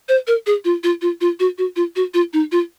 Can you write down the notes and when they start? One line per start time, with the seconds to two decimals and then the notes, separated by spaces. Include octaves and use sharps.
0.09 C5
0.27 A#4
0.47 G#4
0.65 F4
0.84 F4
1.02 F4
1.21 F4
1.40 F#4
1.58 F#4
1.76 F4
1.96 F#4
2.14 F4
2.33 D#4
2.52 F4